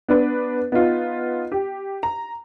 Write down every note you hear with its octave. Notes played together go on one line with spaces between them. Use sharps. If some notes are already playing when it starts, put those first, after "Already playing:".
B3 D4 B4
B3 D#4 F4
G4
A#5